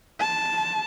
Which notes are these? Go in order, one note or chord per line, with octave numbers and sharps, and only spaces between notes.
A5